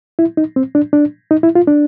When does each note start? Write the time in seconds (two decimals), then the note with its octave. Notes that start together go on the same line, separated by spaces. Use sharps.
0.19 E4
0.37 D#4
0.56 C4
0.75 D4
0.93 D4
1.31 D#4
1.43 E4
1.55 F4
1.68 D4